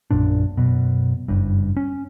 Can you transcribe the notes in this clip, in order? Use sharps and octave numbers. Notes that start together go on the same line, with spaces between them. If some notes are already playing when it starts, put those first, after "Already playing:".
A#1 F#2 A#2 D4
F#2 B2
F#1 G2
C#4